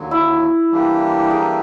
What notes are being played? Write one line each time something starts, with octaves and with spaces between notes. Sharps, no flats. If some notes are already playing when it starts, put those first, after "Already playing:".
Already playing: D#2 D3 F#3
E4
E3 G3 A#3 D4 G4
G#4 A#4